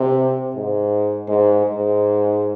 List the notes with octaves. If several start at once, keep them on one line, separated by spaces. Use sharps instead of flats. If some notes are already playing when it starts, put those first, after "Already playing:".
Already playing: C3
G#2
G#2
G#2